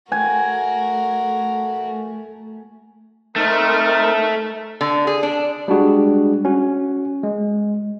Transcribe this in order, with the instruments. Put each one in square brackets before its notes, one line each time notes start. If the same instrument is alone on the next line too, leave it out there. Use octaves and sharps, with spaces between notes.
[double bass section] A3 [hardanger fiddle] F#4 A#4 [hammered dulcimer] G#5
[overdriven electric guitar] A3 [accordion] C4 D#4 A#4
[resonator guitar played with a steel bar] D3
G#4
D4
[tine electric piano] G3 G#3 D4 F#4 G#4
C#4 F#4
G#3